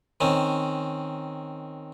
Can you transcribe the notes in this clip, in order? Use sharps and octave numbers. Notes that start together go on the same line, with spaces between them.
D#3 C4 C#4